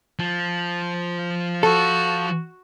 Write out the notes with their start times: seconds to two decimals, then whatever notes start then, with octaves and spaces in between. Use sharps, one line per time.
0.19 F3
1.63 F#4 A4